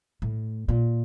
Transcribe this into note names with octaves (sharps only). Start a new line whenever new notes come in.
A2
A#2